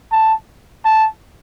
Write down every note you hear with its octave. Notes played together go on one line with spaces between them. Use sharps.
A5
A5